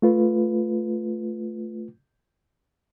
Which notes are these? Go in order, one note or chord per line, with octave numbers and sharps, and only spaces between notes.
A3 F4 B4